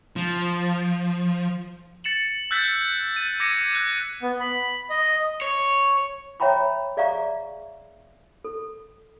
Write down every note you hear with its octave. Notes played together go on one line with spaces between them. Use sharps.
F3
A6 C#7 E7 F#7
E6 F#6 G6 A6 B6
A6 D#7
D6 G#6 A#6 C#7 D#7
F#6
B3
B5
D#5
C#5
C#5 E5 G5 A#5 B5 C#6
G#4 D5 E5 F5 A#5 C#6
A4